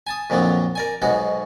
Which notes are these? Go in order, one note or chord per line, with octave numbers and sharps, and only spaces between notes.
G#5 A5 D#6
F2 A#2 D3 F3 F#3
A#4 D5 G#5
B1 G#2 B2 G#3 F#4